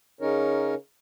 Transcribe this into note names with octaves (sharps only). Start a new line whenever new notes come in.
C#3 C#4 D#4 A#4 C#5